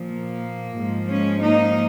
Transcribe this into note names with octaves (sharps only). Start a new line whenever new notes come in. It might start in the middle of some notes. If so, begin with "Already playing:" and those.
Already playing: A#2 F3
A#3
G#2 F3 G#3
G#3 C#4
A#3 D#4